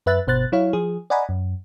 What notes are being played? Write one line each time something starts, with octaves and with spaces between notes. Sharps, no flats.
F#2 B4 E5 F#6 A6
G1 B2 C5 F#6 A6
F#3 E4 C#5 F5
F3 G#4
D5 D#5 F#5 G#5 A#5 B5
F#2